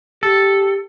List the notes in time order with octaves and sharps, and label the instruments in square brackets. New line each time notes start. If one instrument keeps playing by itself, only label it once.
[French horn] G4 [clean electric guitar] A4